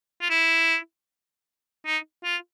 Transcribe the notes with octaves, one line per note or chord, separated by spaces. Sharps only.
F4
E4
D#4
F4